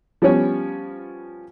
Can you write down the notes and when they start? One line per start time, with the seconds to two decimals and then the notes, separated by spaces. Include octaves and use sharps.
0.22 F3 G3 B3 C#4 C#5